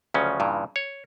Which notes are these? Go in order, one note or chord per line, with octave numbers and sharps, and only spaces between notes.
D2 C#3 F3 F#3 C#4
G2 A#2 C#3 E3
C#5